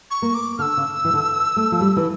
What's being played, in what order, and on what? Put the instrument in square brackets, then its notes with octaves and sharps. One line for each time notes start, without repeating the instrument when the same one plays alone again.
[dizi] C#6
[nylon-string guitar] A#3
[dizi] D6
[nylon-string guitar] D3 [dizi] F6
[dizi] E6
[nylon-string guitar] C#3
E3
D3
A3
F3
G3
E3